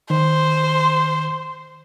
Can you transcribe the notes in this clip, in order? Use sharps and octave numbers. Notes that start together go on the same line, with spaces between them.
D#3 C5